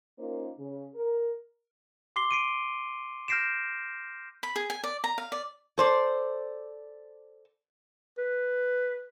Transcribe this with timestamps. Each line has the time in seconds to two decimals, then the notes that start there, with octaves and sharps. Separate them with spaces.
0.19 A#3 C#4 D#4 F4 A#4 C5
0.59 C#3
0.95 A#4
2.16 C6 D6 C7 G7
2.31 C7 D7 D#7
3.28 F6 G6 A#6 C7 D7 E7
4.43 B5
4.56 G#4
4.70 G#5
4.83 D5
5.04 A#5
5.18 F5
5.32 D5
5.78 A4 C5 D5
8.18 B4